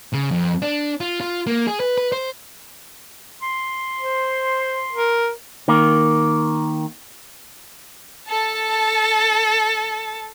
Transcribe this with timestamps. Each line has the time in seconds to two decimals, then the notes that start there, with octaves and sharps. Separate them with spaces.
0.13 C#3
0.31 F2
0.62 D4
1.01 F4
1.20 F4
1.47 A#3
1.67 G#4
1.80 B4
1.98 B4
2.12 C5
3.42 C6
4.00 C5
4.92 A#4
5.68 D#3 A#3
8.29 A4 A5